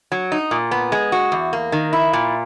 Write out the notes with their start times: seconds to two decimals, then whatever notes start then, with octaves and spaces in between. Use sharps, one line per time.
0.12 F#3
0.32 D#4
0.51 A#2
0.71 B3
0.92 G#3
1.12 F#4
1.32 E2
1.53 A#3
1.72 D#3
1.93 E4
2.13 A#2